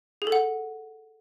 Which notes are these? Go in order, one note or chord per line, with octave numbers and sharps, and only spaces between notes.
G#4
A4
F#5